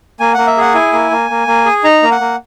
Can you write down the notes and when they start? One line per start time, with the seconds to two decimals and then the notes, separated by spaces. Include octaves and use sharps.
0.20 A#3 G#5
0.34 A#3 F#5
0.47 E5
0.57 G#4 F#5
0.74 E4 G#5
0.93 A#3
1.11 A#3
1.30 A#3
1.47 A#3
1.66 G#4
1.84 D#4 A#5
2.03 A#3
2.11 F#5
2.21 A#3